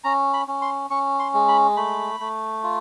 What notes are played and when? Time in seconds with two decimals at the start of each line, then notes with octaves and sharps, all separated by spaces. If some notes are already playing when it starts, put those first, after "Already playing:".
0.04 C#4 A#5
0.33 B5
0.48 C#4
0.62 C6
0.90 C#4 C#6
1.19 C6
1.34 G#3
1.48 B5
1.77 A3 B5
2.20 A3
2.63 F4